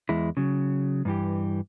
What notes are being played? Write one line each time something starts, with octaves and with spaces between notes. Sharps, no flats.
E2 G#3 E4
C#3 F#3
G2 E3 G4